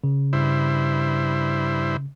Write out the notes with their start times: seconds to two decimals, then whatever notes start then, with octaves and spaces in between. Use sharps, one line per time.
0.04 C#3
0.33 G2 E4 C5